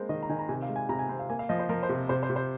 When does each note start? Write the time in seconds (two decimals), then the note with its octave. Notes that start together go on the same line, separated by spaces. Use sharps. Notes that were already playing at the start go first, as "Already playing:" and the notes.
Already playing: G#3 A#3 C4 A#4 C5
0.09 D#3 D#5
0.23 A#5
0.29 D#3 G#5
0.39 A#5
0.49 C3 G#5
0.62 F5
0.69 G#3
0.76 G#5
0.89 C3 A#5
0.99 G#5
1.09 C4
1.19 F5
1.29 A#3 G#5
1.39 F5
1.49 F3 D#5
1.59 C5
1.69 F3 A#4
1.83 C5
1.89 C3
2.09 C3 C5
2.23 C5
2.30 C3
2.36 C5